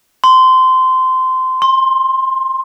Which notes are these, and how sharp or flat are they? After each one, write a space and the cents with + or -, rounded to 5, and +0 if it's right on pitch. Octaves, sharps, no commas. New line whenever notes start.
C6 -20
C6 +20